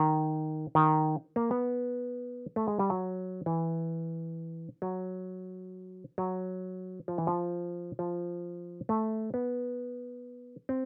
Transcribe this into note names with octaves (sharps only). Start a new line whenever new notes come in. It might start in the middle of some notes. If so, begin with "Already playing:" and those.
Already playing: D#3
D#3
A#3
B3
A3
G#3
G3
F#3
E3
F#3
F#3
F3
E3
F3
F3
A3
B3
C4